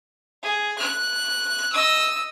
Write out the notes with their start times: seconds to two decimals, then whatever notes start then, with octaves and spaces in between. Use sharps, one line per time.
0.43 G#4
0.78 F#6
1.72 D#5 E6